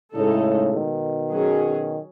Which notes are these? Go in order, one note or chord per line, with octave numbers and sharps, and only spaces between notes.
A2 C#3 G#3 D#4 A4
B2 D#3
F#3 C#4 G#4